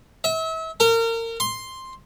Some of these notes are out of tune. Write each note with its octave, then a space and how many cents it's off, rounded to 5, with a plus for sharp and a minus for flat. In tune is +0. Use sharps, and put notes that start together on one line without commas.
E5 -35
A#4 -30
C6 +5